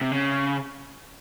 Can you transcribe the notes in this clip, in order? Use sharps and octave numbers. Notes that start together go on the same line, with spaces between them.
C3
C#3